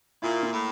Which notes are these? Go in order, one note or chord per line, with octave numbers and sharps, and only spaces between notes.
A#2 E4
A#3
A2